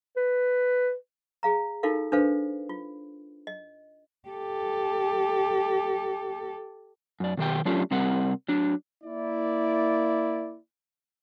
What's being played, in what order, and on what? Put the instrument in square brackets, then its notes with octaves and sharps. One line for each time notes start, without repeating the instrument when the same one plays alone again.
[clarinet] B4
[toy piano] G#4 F5 A#5
D#4 E4 F#4 A4 A#4 F5
D4 A4 B4 C5 F5
F4
D#5
[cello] G4 A4
[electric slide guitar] F#2 D5
B2 D#3 G4 G5
F#3 A3 C#4 D4 F4 G4
C3 G3 C4 A#4 F#5
F#3 D4
[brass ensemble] A#3 E4 D5